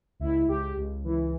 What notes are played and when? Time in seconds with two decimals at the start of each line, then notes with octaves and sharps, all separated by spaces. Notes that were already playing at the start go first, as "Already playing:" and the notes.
0.20 C#2 E4
0.48 C#2 G4
0.76 C#2
1.04 E3